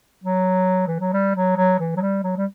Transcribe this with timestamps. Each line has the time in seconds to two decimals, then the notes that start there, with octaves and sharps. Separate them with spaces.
0.24 F#3
0.87 E3
1.00 F#3
1.13 G3
1.35 F#3
1.57 F#3
1.79 E3
1.96 F#3
2.01 G3
2.24 F#3
2.37 G3